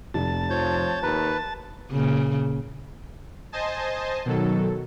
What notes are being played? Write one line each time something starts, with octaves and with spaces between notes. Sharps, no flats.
F1 A5
F3 C#5 G6
D#2 B4 A#5
A#2 C#3
C5 D#5 G#5 A5
B2 D#3 F#3 A4